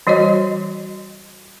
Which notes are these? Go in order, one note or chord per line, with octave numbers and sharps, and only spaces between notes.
E3 G3 F#4 C#5 D#5